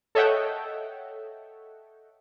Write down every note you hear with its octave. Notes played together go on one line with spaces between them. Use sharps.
A4 C#5 D#5 E5 F#5 G5